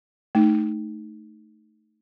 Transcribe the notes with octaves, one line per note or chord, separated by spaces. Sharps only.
A3 D#4